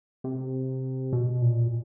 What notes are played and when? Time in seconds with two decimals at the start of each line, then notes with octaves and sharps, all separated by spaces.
0.24 C3
1.13 B2
1.42 A#2